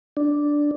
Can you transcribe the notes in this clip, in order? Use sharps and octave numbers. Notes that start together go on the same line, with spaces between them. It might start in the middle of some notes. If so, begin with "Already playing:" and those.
D4